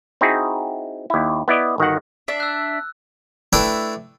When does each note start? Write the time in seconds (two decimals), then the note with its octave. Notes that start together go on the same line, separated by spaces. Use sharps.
0.21 C4 D#4 E4 F#4 G#4
1.10 D#2 E4
1.48 B3 E4 D5 D#5
1.78 G1 D#3 F#4 F#5
2.28 D4 E5
2.40 E6 F#6
3.53 A3 D4 E4 B4 G5